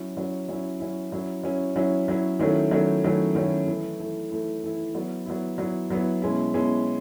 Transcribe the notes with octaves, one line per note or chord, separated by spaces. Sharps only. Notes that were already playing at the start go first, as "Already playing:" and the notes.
Already playing: F#3 C#4 E4
F#3 C#4 E4
F#3 C#4 E4
F#3 C#4 E4
F#3 C#4 E4
F#3 C#4 E4
F#3 C#4 E4
F#3 C#4 E4
D#3 F#3 A3 C#4 E4
D#3 F#3 A3 C#4 E4
D#3 F#3 A3 C#4 E4
D#3 F#3 A3 C#4 E4
E3 A3 E4
E3 A3 E4
E3 A3 E4
E3 A3 E4
F#3 B3 E4
F#3 B3 E4
F#3 B3 E4
F#3 B3 E4
B2 G#3 C#4 E4
B2 G#3 C#4 E4